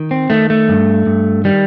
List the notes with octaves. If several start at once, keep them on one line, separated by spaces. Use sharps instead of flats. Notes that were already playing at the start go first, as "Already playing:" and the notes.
Already playing: D#3
C4
D#3 A3
A3
G2
G2
D#3 G3